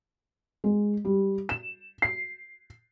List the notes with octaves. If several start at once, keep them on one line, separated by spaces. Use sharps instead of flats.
G#3
G3
E7
C7